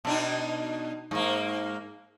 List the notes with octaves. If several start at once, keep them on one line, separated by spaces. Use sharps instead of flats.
B2 D4 D#4
G#2 A#3